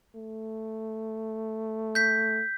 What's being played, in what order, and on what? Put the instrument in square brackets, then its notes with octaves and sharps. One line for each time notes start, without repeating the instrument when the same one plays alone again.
[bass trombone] A3
[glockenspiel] G6 B6